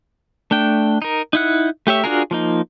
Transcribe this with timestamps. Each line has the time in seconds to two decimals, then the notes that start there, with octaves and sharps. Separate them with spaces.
0.51 A3 D4 G5
1.02 D#4 A#4
1.33 D#4 E4 F#5
1.87 A3 G4 C#5 E5
2.04 D4 F4 F#4 G#4 A#4
2.31 F3 A#3 D#4